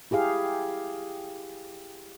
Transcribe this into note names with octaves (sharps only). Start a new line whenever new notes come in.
E4 G4 G#4 F5